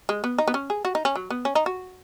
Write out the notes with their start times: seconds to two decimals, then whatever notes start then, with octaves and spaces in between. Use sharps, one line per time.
0.09 G#3
0.24 B3
0.38 D#4
0.48 B3
0.54 C#4
0.70 G#4
0.85 F#4
0.95 D#4
1.05 C#4
1.16 F#3
1.30 B3
1.45 C#4
1.55 D#4
1.66 F#4